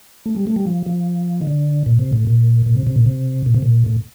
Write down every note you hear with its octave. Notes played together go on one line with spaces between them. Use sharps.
A3
G3
A3
G3
F3
F3
D#3
D3
A#2
C3
A2
A#2
A#2
C3
C3
A#2
C3
A#2
C3
A#2
A2